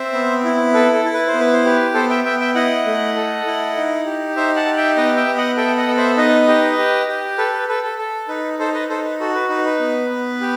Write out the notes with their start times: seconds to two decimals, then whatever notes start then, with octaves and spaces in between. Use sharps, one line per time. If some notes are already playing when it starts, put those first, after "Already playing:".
Already playing: C4 C5 E5
0.13 B3
0.44 E4
0.74 A4 B4
0.94 A4
1.05 E4
1.14 B4
1.27 C5
1.34 B3
1.40 B4
1.53 C5
1.65 G4 B4
1.94 B3 A4 C5
2.10 E5 G5
2.25 B3 E5 G5
2.40 E5 G5
2.55 E4 D#5 F#5
2.86 A3
3.16 A4
3.46 E4
3.77 D#4
4.06 G4
4.36 D#4 C5 E5
4.56 F#5 A5
4.66 G4
4.77 E5 G5
4.96 B3 B4 D#5
5.17 E5 G5
5.27 B3
5.37 D#5 F#5
5.57 A4 E5 G5
5.77 D#5 F#5
5.88 B3
5.97 C5 E5
6.17 D#4 B4 D#5
6.48 G4
6.78 G4
7.08 G4
7.38 A4 B4
7.53 B4
7.68 A4 B4
7.84 A4
7.98 A4
8.28 D#4 B4
8.59 D#4 A4 C5
8.74 B4 D#5
8.89 D#4 A4 C5
9.04 B4
9.20 F#4 A4
9.35 B4
9.49 D#4 B4
9.65 B4
9.80 B3
10.10 B3
10.41 G4